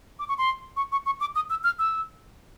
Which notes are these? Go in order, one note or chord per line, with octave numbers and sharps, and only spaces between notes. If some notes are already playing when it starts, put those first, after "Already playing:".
D6
C#6
C6
C#6
C#6
C#6
D6
D#6
E6
F6
E6